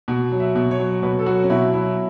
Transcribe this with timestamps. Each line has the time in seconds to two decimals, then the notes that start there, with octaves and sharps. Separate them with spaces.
0.08 B2
0.32 F#3
0.40 E5
0.55 B2
0.71 C#5
0.79 F#3
1.03 B2 B4
1.19 A4
1.26 F#3 F#4
1.44 C#4
1.50 B2 E4
1.73 F#3 E4